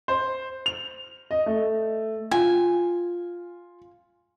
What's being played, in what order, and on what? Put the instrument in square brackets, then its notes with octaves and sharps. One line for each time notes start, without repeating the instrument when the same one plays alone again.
[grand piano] C5
F7
D#5
A3
[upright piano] F4 [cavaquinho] G#5